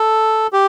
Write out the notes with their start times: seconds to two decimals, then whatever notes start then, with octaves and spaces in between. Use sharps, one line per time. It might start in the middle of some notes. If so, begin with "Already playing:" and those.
Already playing: A4
0.53 G4